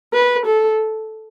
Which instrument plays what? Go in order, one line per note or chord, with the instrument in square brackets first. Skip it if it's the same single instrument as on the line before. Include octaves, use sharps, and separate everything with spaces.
[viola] B4
A4